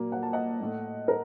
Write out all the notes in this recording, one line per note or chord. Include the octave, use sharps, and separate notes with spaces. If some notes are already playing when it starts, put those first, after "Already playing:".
Already playing: A#2 F#3 A#3
F#5
A5
D#5 F#5
A2 A3
A#4